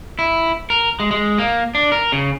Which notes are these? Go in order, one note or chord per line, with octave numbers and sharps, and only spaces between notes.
E4
A#4
G#3
G#3
A#3
D4
A#4
C#3